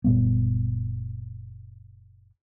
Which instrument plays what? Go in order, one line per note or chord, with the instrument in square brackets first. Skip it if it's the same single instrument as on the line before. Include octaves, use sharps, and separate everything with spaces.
[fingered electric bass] F#1 A#2 G3 B3